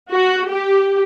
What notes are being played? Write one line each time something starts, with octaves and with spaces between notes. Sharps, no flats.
F#4
G4